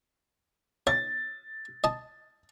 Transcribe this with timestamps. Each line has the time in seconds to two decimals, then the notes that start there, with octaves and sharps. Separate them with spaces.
0.87 C#5 A6
1.84 D#5 A5